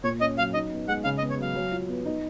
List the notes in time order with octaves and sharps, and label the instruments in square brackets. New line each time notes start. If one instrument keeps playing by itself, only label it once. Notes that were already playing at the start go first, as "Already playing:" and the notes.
[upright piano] A#2 [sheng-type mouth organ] C#5
[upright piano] C#4 [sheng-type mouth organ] D#5
[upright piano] F#3 [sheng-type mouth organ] F5
[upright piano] D#4 [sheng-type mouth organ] D#5
[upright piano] B3
[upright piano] G#3 [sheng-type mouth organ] F#5
[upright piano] C#3 [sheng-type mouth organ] F5
[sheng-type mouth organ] D#5
[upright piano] B3
[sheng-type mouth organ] C#5
[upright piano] F#3 [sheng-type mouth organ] F5
[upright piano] F#3
F4
B3
D#4